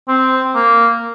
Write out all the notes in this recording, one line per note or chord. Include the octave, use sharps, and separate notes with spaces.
C4
A#3